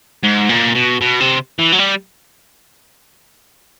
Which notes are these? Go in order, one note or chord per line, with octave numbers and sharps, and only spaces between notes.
G#2
A#2
B2
B2
C3
E3
F#3
G3